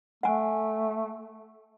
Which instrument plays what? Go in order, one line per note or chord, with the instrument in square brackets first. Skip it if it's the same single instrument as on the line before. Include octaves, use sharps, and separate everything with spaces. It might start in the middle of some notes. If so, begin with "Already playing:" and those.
[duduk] A3 [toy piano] F#5 G#5